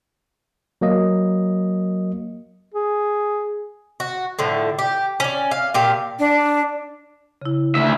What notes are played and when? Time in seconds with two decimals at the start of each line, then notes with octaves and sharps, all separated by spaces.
0.81 F#3 A#3 D#5
2.74 G#4
4.00 F#4
4.39 A2 D3 F3
4.79 G4
5.20 C#4 D5
5.51 F5
5.74 A#2 G4 F5
6.19 D4
7.41 C#3 E4
7.75 D2 E5